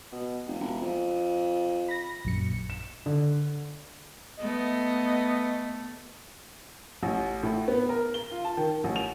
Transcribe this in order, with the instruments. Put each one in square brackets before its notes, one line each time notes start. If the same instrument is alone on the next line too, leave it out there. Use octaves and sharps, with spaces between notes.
[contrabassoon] B2
F1
E1
F2
[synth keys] B5 A#6
A#1 F#2 C#7
[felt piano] E7
D3
[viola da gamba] A3 B3 [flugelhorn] D#5
[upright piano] A1
A2
B3
A#4
G7
F4
A5
D#3
A1
F7